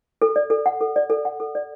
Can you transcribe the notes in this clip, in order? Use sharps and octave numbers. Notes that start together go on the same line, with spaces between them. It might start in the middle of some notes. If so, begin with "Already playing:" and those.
A4
D5
A4
F#5
A4
D5
A4
F#5
A4
D5